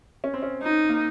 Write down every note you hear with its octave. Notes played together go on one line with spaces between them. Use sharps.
C#4
C4
C#4
D#4
A#3